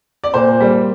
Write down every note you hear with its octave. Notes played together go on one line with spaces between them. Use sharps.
D5
A#2 C5
G3 A#3